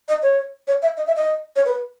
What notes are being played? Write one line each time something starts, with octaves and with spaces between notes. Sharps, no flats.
D#5
C#5
C#5
E5
D#5
E5
D#5
C#5
B4